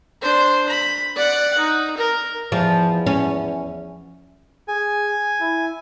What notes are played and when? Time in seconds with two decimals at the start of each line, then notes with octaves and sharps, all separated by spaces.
0.22 D4 C5
0.69 B5
1.15 D5 F#5
1.58 D#4
1.97 A#4
2.52 E2 F3
3.06 C#4
4.68 G#4 G#5
5.41 E4